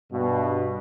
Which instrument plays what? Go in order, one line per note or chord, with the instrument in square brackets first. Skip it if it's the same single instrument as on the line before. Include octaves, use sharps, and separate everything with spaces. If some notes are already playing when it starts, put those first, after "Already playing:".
[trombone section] G2 B2